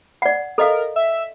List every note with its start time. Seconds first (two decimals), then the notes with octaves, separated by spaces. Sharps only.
0.22 D5 F#5
0.58 A4 A#4 D#5 F5
0.96 E5